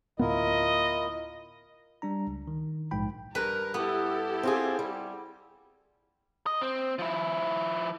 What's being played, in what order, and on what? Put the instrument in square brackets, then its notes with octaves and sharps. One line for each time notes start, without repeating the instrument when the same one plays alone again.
[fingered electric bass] D2 A2 B3 [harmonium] E4 F4 A#4 [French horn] D#5
[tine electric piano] G3 D4 A#5
C#2
D#3
A#1 G#2 G5 B5
[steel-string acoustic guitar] G2 [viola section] A#4 [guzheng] B4
[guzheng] B3 [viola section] E4 G4 A4
[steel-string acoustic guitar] C4 F4 G#4
G3
[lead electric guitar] D#5
C4
F3 E4